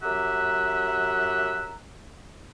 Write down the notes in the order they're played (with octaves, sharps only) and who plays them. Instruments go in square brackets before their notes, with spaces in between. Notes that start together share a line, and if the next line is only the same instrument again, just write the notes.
[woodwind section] F#2 G4 E5 F#5 A#5